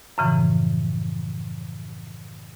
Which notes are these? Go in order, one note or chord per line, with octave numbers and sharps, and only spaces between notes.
F#2 A2 C#3 E3 F3